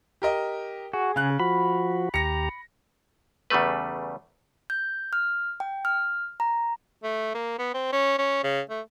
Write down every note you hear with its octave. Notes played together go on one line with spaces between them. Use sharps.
G4 A#4 D#5
F#4 G#4
C#3 F5 F#6
F3 F#4 B5
D#2 G4 A#5 A#6 C#7
E2 C#3 G3 A3 B4
G6
F6
G5
F6
A#5
A3
A#3
B3
C4
C#4
C#4
C#3
A3